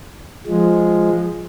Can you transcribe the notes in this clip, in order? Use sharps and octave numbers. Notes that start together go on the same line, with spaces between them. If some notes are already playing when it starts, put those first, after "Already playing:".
F3 G#3